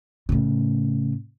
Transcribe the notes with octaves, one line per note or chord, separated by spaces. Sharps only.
A2 C#3